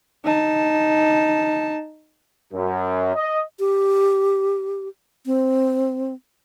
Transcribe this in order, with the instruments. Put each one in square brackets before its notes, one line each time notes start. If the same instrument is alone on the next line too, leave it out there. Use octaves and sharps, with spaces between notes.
[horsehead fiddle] D#4 A5
[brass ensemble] F#2
D#5
[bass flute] G4
C4